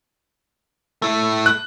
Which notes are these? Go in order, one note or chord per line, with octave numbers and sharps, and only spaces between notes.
A3 E4
F#6